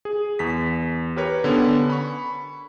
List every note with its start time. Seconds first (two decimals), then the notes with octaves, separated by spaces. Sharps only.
0.05 G#4
0.39 E2 B6
1.16 G4 A#4 B4 C#5
1.44 D3 B3 C#4
1.90 B5 C#6